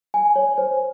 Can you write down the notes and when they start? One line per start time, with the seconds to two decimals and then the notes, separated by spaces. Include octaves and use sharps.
0.14 G#5
0.36 C#5
0.58 C5